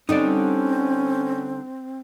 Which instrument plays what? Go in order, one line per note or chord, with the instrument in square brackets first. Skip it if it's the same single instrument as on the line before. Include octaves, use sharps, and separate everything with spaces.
[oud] D3 G3 [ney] C4 [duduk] C#4 [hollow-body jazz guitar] D#4 D5